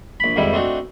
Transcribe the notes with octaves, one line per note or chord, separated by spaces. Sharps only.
A#1 B5
F2 G#2 D#3 G3 E4
A3 C4 D4 D#4 F#4